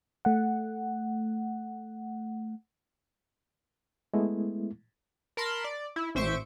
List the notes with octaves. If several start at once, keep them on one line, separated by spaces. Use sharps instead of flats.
A3 F#5
G#3 A3 B3 E4
A#4 A5 B5 C6
D5
E4
A1 C5 E5 C#6 D7